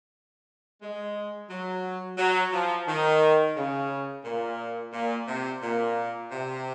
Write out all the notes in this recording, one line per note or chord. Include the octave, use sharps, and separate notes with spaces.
G#3
F#3
F#3
F3
D#3
C#3
A#2
A#2
C3
A#2
C3